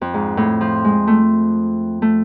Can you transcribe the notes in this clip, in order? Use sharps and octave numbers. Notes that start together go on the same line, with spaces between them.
F2
G#2
A2
F3
G#3
A3
A3